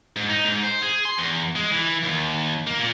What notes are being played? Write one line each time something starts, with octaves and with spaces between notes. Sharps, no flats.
G#2
D#4
G#2
C5
G#4
C6
E2
G#3
E3
D#2
A#3
A#2